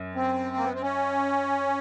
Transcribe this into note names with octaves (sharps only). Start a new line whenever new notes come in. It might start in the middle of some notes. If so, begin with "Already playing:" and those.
Already playing: F#2
C4
A#3
B3
C4
C#4